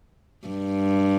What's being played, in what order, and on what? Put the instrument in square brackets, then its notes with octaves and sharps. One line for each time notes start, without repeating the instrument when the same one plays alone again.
[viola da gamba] G2